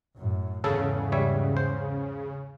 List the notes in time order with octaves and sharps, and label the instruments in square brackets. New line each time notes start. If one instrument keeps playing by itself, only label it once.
[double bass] F#2 A2
[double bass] E2 G#2 [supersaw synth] C#3 [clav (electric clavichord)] A4
[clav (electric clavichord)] G3 C#5 E5
C5